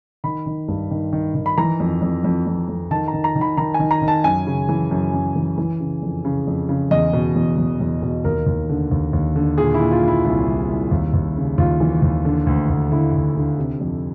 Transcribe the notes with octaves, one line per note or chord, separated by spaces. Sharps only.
D#3 B5
D#3
G2
D#3
D#3
D#3
B5
E3 A#5
F2
F2
F2
F2
F2
D#3 A5
A#5
D#3
A#5
D#3
B5
D#3 A#5
G#5
D#3
A#5
D#3
A5
F#2 G#5
C#3
E3
F#2
F#2
E3
E3
C#3
F2
C#3
F2
C#3
E2 D#5
B2
E2
E2
E2
B2
D#2 A#4
D#2
D3
D#2
D#2
D3
A#2 G#4
E4
A#2
F4
A#2 E4
C2 E4
C2
C2
D#2
D#2
C#3
D#2 F4
E3
D#2
D3
D2
D2
D3 E4
D2
D3
C3
F2